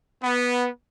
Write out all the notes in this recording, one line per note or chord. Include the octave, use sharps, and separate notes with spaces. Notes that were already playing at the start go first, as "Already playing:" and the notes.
B3